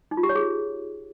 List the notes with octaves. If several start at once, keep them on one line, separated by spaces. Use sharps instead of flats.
D#4
F4
G4
C#5
G#4